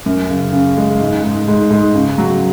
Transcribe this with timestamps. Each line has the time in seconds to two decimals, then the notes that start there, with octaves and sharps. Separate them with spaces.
0.06 F#2
0.30 C#3
0.53 C#3
0.77 G#3
1.00 G#2
1.23 G#2
1.48 G#2
1.70 G#2
1.95 C#3
2.18 F#3